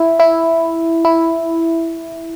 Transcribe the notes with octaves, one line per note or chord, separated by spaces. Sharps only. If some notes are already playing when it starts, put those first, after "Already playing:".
Already playing: E4
E4
E4